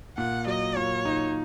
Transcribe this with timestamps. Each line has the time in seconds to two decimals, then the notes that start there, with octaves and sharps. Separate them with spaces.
0.18 A#2 F#5
0.47 F#3 D#5
0.76 A#2 C#5
1.05 D#4